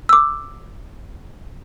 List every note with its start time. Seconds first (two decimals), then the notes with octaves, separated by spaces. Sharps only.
0.09 D6 E6